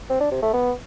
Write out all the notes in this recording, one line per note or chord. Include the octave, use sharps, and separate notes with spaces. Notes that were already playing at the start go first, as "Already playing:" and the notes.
C4
D4
C3
A3
B3